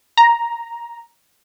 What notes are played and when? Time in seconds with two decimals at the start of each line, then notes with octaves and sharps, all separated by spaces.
0.17 A#5